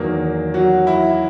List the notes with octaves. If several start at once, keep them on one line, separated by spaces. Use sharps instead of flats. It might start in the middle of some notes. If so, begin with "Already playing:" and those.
Already playing: E2 D#3 F#3 A#3
F#3 F#4
E4